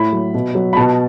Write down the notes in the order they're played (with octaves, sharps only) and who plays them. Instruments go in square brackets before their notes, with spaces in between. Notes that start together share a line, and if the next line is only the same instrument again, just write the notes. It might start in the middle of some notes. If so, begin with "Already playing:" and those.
Already playing: [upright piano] A2 B5
F#3
B2
F#3
B5
B2 A5